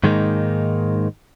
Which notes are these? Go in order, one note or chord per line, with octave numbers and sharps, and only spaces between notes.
G#2 D#3 G#3 A#3 D#4